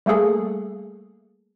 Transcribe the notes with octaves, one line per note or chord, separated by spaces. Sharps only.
G3 A3 A#3 G#4 A4